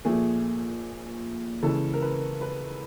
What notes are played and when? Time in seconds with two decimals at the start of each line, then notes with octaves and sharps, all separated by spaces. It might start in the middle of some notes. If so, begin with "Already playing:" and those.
0.05 A#2 F3 A3 G#4
1.62 C#3 E3 G#3 A4
1.93 A#4
2.02 B4
2.41 B4